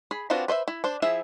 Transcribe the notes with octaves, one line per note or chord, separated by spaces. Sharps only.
G#4 B5
C4 D4 F4 F#4 B4
B4 C5 D#5 E5
E4
D4 C5
F3 E4 G#4 E5